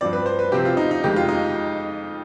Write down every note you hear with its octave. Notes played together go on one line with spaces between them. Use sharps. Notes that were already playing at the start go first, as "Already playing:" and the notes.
G2 F3 C4 D5
B4
C5
B4
C3 F3 C4 G4
F4
D#4
D#4
F2 D#3 G#3 G4
F4
D#4